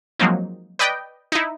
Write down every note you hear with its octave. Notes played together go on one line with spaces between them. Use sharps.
F3 F#3 G#3 A#3 C4 D#4
B4 D5 D#5 G5
D#4 E4